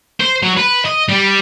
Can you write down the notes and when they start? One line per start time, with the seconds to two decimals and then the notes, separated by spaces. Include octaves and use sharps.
0.20 C5
0.42 F#3
0.57 B4
0.85 D#5
1.09 G3